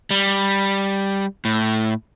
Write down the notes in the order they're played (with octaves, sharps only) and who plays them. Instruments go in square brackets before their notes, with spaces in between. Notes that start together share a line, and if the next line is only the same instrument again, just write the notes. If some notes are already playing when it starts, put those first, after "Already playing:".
[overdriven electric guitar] G3
A2